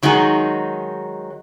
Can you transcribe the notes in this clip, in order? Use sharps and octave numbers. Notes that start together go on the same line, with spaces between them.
D#3 F#3 G#3 D#4 G#4